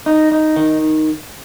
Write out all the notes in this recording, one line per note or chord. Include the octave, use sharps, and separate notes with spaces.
D#4
D#4
D#3